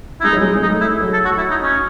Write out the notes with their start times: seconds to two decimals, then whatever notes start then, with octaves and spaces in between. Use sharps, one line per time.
0.20 E4
0.24 G#3 D#4
0.33 F#3
0.41 G#3
0.55 G#3
0.62 A3 D#4
0.81 E4
1.00 F#3
1.13 A4
1.25 F#4
1.38 E4
1.51 D#4
1.63 C#4